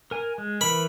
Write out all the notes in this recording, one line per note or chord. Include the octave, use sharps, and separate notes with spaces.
A#4 G#5
G#3
E3 A#4 B5